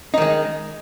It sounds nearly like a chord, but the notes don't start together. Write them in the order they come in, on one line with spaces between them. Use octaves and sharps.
D#4 D#3 G#3